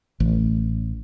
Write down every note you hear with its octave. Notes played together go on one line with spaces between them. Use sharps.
A1